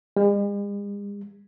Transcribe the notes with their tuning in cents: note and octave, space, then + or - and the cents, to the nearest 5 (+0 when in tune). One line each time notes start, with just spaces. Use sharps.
G#3 -45